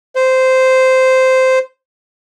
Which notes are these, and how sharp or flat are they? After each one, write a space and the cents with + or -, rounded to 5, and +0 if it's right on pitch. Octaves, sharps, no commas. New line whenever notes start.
C5 -10